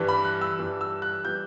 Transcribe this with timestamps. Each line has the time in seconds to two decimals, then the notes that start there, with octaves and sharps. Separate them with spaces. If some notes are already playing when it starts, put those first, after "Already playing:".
Already playing: G2 E3 G3
0.08 B5
0.25 F#6
0.41 E6
0.59 G2 E3 G3
0.81 E6
1.02 F#6
1.25 E3 G3 G6